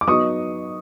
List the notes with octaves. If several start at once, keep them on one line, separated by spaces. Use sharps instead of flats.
D6
F#3 B3 D#4 C#6 D#6